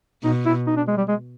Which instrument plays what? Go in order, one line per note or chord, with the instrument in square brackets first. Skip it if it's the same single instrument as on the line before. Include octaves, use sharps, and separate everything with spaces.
[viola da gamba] B2 [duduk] D#4
[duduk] E4
D#4
D4
G#3
G3
G#3